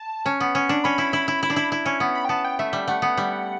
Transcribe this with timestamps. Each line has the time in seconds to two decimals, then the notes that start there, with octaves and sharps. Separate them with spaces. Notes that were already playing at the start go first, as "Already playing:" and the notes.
Already playing: A5
0.26 C#4
0.40 B3
0.55 C#4
0.69 D4
0.84 C#4 B5
0.98 E4
1.13 E4
1.28 E4
1.43 E4
1.50 D4
1.56 E4
1.72 E4
1.86 C#4
2.00 B3
2.15 B5
2.25 G5
2.29 B3 A5
2.45 G5
2.59 A3 E5
2.73 G3
2.88 A3 F#5
3.02 B3
3.17 G3